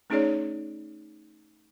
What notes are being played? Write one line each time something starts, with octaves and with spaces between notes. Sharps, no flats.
A3 C#4 D#4 G#4 C#5 D5